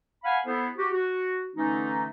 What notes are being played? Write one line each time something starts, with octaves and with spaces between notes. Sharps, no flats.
F5 F#5 G#5 B5
B3 E4 A4 C5
F#4 G4
F#4
D3 E3 A3 C#4 D#4